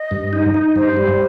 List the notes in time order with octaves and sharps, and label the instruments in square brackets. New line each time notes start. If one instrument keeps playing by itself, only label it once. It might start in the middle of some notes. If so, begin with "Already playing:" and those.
Already playing: [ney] D#5
[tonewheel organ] G2
D#4
D#4
[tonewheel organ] G2 [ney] C5
[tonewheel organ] G3